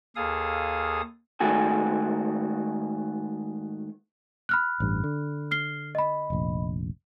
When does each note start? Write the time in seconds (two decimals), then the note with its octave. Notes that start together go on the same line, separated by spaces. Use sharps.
0.16 D#2 G#4 A4 F5 D#6
1.40 G#2 D#3 A3 F#4 G#4
4.49 B5 F6 F#6
4.80 A1 G2
5.04 D3
5.51 F6 C7 G7
5.95 D#5 B5
6.30 F1 A#1